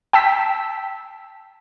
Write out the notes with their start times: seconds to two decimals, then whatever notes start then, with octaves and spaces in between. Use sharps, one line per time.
0.13 G5 A5 E6 B6